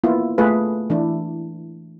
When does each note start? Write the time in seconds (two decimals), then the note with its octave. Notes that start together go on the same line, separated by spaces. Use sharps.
0.04 A#3 B3 E4 F4
0.38 A3 F4 G#4 B4
0.90 E3 D4 E4